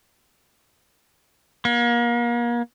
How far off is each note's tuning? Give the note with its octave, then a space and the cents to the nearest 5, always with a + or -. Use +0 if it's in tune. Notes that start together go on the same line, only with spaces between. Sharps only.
A#3 +35